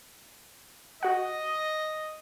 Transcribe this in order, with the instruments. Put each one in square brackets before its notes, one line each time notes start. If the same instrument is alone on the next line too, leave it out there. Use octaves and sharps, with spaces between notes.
[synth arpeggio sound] F#4 F#5 [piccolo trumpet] D#5